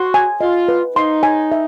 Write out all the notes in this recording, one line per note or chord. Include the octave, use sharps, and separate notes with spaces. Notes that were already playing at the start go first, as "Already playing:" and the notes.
Already playing: F#4 C6
G#5
F4 D#5
B4
D#4 C6
G#5
E5